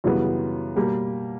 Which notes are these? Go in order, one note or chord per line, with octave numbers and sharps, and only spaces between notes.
F#2 C#3 E3 G3 B3
B2 G3 A#3